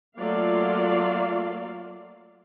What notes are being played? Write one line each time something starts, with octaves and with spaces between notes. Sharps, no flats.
F#3 A3 A#3 F4 D5 F5